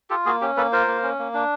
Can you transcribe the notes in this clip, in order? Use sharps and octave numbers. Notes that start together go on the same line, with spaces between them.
F4 G4 A4
A#3 F#4 G#4
C#4 G4
A#3 A4 B4
F4 A#4 C5
A#3
C#4
A#3
D4